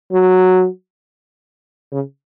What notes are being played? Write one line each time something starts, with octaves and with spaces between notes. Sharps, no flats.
F#3
C#3